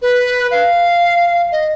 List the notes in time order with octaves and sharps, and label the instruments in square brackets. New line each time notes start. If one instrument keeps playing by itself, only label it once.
[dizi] B4
F5
D#5